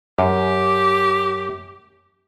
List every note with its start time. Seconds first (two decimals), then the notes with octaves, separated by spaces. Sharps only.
0.19 F#2 G4